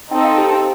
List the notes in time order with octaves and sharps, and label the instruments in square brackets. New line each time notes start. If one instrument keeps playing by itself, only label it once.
[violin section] C4 D#4 A4 [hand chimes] G5
[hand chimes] F5
G4 G5